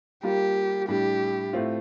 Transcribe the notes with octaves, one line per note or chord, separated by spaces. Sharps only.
G3 A#3 F4 G4 A#4
A2 G3 D4 G4
A2 A3 C4 F4